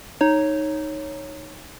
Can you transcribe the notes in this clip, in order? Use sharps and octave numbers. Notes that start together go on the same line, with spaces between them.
D#4 C#5